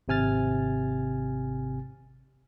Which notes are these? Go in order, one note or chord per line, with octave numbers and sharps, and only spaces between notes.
G#1 C3 G#5 F6 A6